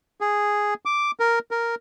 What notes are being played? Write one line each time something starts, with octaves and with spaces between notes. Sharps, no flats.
G#4
D6
A#4
A#4